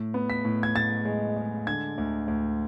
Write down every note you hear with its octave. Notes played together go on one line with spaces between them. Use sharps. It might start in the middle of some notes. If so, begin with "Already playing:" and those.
Already playing: A2
B3
B6
A2
G#6
A2 A6
G#3
G#3
D3 G#6
D2
D2